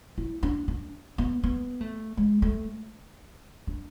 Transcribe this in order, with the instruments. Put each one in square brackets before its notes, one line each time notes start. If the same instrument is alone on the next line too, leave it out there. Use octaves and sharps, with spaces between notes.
[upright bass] E4
D4
D4
B3
B3
A3
G#3
A3
D4